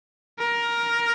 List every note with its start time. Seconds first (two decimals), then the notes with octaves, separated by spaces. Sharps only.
0.39 A#4